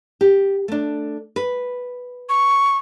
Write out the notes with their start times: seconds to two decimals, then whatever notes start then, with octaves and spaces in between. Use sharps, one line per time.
0.21 G4
0.68 A3 D4
1.36 B4
2.29 C#6